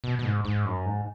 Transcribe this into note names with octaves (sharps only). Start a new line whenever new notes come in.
B2
B2
G#2
G#2
F#2
G#2